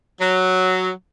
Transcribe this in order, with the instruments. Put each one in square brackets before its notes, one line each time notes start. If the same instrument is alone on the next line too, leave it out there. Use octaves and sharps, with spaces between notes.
[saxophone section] F#3